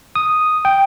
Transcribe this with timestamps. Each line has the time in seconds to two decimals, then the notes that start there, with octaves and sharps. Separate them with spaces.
0.15 D#6
0.65 G5